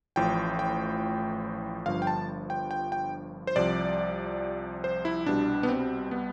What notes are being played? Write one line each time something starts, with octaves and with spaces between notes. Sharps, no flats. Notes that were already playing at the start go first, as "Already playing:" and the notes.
A1 A2 F3 G5
G5
G1 G2 F3 F5
G5
A5
G5
G5
G5
C5
C2 C3 F3 D5
C5
E4
C2 B2 G3 D4
B3
C4
B3